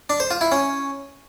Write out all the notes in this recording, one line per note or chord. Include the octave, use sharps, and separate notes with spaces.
D4
C5
F4
E4
C#4